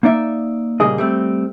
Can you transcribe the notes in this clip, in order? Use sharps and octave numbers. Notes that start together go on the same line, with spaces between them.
A#3 D#4 D5 E5
A#2 C#3 G3 A#3 G#4 D#5
G3 A3 C4